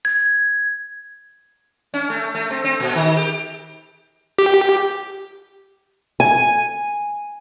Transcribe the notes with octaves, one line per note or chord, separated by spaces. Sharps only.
G#6
C#4
A3
A3
C4
C4
A#2
D#3
G4
G4
G#5